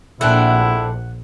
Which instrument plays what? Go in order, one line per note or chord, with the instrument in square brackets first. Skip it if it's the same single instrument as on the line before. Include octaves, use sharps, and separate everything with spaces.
[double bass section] A#1 [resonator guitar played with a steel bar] A3 C4 D4 [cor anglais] E4 [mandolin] F#5